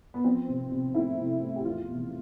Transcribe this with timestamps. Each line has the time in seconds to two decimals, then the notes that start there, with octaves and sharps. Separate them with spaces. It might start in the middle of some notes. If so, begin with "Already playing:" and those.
0.14 B3
0.24 F3 C4
0.48 C3
0.71 C3
0.94 A3 E4
1.18 C3
1.42 A3
1.56 G4
1.64 E2 F4
1.88 B2